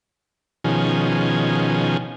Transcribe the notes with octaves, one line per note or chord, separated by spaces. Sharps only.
B2 D#3 F3 C#4 G#4